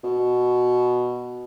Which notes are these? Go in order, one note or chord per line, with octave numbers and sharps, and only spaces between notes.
B2